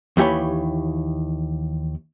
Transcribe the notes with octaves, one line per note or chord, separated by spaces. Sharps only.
D#2 E3 G4 C#5 B5